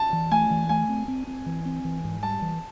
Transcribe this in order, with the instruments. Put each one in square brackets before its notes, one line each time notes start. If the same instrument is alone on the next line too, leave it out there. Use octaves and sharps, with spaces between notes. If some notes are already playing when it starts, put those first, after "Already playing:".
Already playing: [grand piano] A5
[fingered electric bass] E3
[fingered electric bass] A3 [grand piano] G#5
[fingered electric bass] E3
[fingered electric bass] A3 [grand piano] G#5
[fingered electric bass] C4
C4
C4
E3
C4
E3
G#2
[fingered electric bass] G3 [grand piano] A5
[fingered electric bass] E3